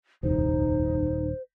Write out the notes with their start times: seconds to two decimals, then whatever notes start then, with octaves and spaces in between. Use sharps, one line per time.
0.23 D#1 C2 F2 D#4 C5